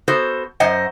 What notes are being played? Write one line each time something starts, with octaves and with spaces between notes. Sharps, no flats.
B3 F#4 A4 C5
F#2 C5 D#5 F#5